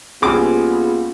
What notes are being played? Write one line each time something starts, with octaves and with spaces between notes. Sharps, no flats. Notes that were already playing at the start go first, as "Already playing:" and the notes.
C2 A#3 B3 C#4 F4 G4 G#4 D6